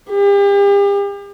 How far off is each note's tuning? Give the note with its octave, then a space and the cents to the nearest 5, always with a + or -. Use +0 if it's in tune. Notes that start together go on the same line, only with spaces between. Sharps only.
G4 +40